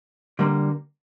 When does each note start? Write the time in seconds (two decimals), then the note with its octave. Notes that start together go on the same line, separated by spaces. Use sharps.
0.39 D3 G3 A#3